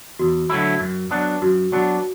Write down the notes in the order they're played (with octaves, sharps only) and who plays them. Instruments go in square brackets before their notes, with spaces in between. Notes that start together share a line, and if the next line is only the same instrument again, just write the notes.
[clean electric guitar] E2 [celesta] F#4
[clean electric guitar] D3 F#3 A3 E4
F#2
F#3 B3 D4
[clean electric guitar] F#2 [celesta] F#4
[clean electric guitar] F#3 B3 D4 [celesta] F#4